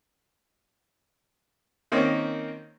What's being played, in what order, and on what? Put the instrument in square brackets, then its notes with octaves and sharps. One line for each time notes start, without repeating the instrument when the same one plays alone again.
[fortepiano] D#3 A#3 C4 C#4 D#4